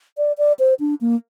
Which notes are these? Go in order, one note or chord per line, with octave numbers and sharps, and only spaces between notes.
D5
D5
C5
D4
A#3